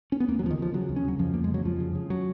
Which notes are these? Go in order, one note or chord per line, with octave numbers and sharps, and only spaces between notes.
C#4
B3
D#2 A#3
F#3
C#3
F3
D#3
C#3 F3
C#3 F#3
D#2
C#4
C#3 F#3
F2 F3
F2 A#3
G#3
C#3 F#3
F2 F3
C#3
C#3
F#3